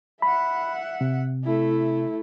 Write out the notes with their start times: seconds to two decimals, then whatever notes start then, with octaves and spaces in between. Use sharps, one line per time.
0.22 E5 F#5 B5
1.01 C3
1.44 A3 E4